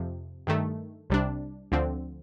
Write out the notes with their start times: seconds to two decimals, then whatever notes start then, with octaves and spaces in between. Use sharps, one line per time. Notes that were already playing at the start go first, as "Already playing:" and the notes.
Already playing: F2 C3 F3
0.47 G2 D#3 A3
1.10 C2 C3 G3 D4
1.72 D2 D3 F3 C4